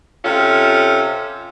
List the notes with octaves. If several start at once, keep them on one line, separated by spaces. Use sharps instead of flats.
C3 C#4 F4 A4